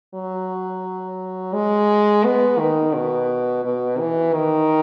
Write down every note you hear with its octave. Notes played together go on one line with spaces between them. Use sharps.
F#3
G#3
B3
D#3
B2
B2
E3
D#3